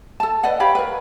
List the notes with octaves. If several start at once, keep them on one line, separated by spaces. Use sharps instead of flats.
A4 A5
B4 D5 D#5 F#5
G4 C#5 F5 B5
A#4 B4